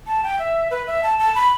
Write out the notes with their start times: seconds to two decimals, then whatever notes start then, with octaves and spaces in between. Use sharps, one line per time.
0.07 A5
0.23 G5
0.39 E5
0.71 B4
0.87 E5
1.03 A5
1.19 A5
1.35 B5